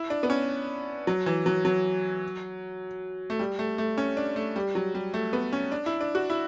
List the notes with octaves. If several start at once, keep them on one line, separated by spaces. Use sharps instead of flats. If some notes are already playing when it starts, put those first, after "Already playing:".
Already playing: E4
D4
B3
C#4
F#3
E3
F#3
F#3
A3
G3
A3
A3
C#4
D4
A3
G3
F#3
G3
A3
B3
C#4
D4
E4
D4
F#4
E4